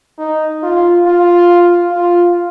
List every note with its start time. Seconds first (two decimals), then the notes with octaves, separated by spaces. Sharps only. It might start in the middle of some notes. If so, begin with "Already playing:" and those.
0.19 D#4
0.63 F4
1.06 F4
1.91 F4